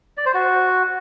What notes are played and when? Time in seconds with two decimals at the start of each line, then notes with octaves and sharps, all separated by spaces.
0.17 D5
0.26 C5
0.34 F#4